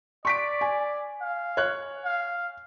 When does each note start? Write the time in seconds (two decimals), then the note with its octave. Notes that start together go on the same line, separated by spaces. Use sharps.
0.25 D5 C#6 B6 D7
0.61 G#5
1.21 F5
1.57 C#5 F#6
2.05 F5